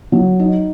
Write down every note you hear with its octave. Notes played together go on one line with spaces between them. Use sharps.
F#3
D#4